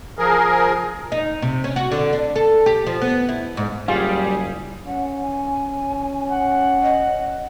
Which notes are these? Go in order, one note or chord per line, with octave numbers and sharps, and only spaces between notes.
F3 G#4 A#4
D#4
C3
C#4
F#4
D3
D4
A4
G4
F3
B3
E4
G#2
F#1 G3 F4 G#4 F5
C#4 F#5
G#5
F#5
D#5